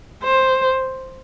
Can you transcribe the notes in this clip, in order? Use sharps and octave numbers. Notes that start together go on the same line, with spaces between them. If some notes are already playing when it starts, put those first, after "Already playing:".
C5